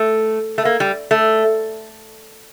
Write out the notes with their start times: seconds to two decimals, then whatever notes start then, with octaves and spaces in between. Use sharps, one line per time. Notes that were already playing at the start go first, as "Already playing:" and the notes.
Already playing: A3
0.58 A3
0.65 A#3
0.80 G3
1.11 A3